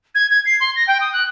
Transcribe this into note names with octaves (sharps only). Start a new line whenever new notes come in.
G#6
G#6
C7
C6
A#6
G5
D#6
F#6